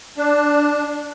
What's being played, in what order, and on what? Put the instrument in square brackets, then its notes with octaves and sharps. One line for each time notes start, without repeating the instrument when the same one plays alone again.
[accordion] D4